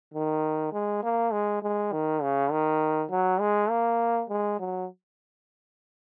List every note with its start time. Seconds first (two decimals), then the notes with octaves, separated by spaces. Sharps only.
0.14 D#3
0.72 G#3
1.03 A#3
1.32 G#3
1.62 G#3
1.92 D#3
2.22 C#3
2.51 D#3
3.11 F#3
3.40 G#3
3.70 A#3
4.29 G#3
4.59 F#3